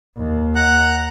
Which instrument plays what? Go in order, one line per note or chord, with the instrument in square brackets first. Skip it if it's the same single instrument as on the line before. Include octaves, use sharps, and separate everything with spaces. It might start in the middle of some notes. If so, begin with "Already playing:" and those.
[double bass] D#2
[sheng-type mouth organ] F#5 A#5 F#6